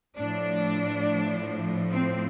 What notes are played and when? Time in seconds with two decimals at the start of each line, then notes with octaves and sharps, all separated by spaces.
0.18 A2 F3 D4
1.92 C4